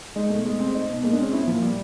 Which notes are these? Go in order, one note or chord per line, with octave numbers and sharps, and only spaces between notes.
G#3 D#4
B2 A3
G#3
C4
D#4
B2
G#3 A#3
D4
C4 C#4
B3 E4
A#2 F3
G3